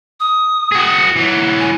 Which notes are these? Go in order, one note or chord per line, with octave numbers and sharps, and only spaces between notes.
D#6
F#4 G#4
E3 F#3
G#5